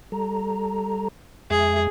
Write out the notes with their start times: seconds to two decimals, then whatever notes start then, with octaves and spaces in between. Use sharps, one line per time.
0.12 G3 A4 A#5
1.50 F2 G#3 G#4 E5